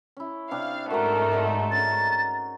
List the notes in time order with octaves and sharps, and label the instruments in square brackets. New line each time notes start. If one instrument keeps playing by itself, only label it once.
[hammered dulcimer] C#4 E4
[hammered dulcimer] C3 D4 [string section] F5
[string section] G#2 A3 [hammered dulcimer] F#4 A#5 [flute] A#4
[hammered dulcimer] D3 G#3 D#4
[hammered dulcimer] C#4 A#4 [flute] A6